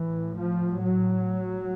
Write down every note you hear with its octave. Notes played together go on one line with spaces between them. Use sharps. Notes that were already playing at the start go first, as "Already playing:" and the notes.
Already playing: A2 E3
F3
F#3